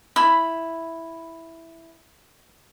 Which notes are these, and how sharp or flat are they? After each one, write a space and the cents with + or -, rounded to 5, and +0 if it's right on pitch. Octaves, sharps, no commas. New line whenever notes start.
E4 +0 B5 +0